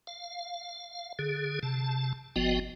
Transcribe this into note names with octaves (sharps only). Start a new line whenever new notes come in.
F5
D3 G#4
C3 A5
G1 F3 B3 F#4 D#5 G5